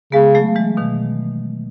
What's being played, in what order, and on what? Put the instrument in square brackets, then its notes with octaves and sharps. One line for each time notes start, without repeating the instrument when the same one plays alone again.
[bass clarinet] C#3 [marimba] G#3 B3
[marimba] F#3 A3
E3 G#3
B2 D#3